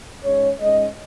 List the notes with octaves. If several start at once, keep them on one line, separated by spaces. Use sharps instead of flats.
G#2 G#3 C#4 C#5
G#2 G#3 C#4 D#5